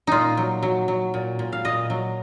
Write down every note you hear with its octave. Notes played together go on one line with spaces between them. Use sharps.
A#2 D#4 F4
F#3
F#3
F#3
A#2
A#2
F5
A#2 D#5
F#3